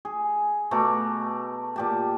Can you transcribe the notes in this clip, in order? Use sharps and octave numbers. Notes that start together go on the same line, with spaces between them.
G#4
B2 A3 A#5 D6
A#2 G4 A5